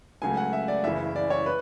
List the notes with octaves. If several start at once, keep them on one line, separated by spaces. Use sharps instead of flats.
C#2 C#3 F#3 A3 G#5
F#5
E5
D5
F#1 F#2 C#3 E3 E5
D5
C#5
B4